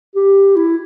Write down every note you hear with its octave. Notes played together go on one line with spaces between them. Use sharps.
G4
E4